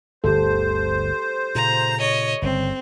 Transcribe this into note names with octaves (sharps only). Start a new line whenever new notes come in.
G1 D2 G4 A4 C5
A#2 C#3 A#5
C#5 D#5
G1 C#3 C4